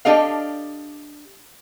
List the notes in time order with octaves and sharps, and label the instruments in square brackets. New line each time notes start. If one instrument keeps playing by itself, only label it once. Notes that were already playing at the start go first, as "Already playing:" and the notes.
[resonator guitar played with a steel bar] D4 G4 A4 D#5 F5